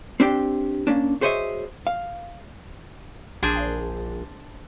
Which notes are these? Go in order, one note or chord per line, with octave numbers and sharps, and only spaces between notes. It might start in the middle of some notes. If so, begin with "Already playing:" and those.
C4 D4 G4 G5
A#3 C#4 D4
F#4 G#4 C5 C#5 D#5 E5
F5
A#1 D4 G#4 C5